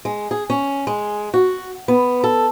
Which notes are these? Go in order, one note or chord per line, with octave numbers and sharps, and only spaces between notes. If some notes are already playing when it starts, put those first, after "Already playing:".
G#3
G#4
C#4
G#3
F#4
B3
A4